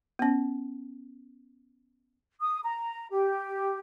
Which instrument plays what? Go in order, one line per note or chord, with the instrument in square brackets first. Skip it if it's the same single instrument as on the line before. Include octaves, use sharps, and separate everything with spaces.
[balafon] B3 C#4
[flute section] D#6
A#5
G4